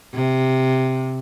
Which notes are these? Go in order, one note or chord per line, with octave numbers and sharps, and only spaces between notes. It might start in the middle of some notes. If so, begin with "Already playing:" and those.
C3